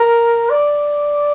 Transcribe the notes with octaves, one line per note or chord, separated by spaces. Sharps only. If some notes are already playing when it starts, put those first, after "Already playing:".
Already playing: A#4
D5